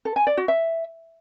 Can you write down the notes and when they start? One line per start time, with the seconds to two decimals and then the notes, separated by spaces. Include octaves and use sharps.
0.05 A4
0.16 G#5
0.27 D5
0.37 F#4
0.48 E5